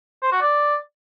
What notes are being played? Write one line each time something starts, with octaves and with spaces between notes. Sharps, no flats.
C5
F#4
D5